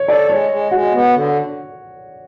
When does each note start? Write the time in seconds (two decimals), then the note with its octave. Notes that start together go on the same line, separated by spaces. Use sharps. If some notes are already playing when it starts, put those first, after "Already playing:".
Already playing: C#5
0.08 A4 D5
0.29 G#3 C#5
0.50 G#3
0.71 G#3 F#4
0.93 B3
1.14 D3